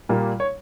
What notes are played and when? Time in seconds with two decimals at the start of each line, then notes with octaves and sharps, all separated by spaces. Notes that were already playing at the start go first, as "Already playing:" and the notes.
0.09 A#2 G3 A#3
0.40 C#5